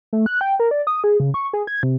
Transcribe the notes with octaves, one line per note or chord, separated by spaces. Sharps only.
A3
F#6
G5
A#4
D5
D#6
G#4
C#3
C#6
G#4
G#6
C3